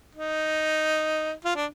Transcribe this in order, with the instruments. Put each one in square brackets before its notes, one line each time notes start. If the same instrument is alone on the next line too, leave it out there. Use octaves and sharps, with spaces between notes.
[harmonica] D#4
F4
D4